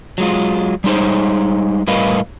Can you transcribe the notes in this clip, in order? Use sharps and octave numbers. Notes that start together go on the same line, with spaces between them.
F#3 G#3 F4
G3 G#3 D#4 C5 C#5
A2 G3 A#4 B4 D#5 F5